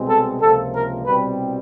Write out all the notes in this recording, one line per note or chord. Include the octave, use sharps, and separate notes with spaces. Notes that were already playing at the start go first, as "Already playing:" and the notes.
Already playing: C2 B2 G#3 C4
A4
C#2 C3 F3 A#3 A4
A#4
C2 B2 G3 C4 B4